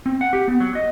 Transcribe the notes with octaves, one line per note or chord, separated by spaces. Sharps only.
C4
F#5
G4
B3
F#3
D#5